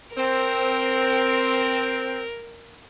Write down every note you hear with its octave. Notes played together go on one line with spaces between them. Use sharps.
C4 A#4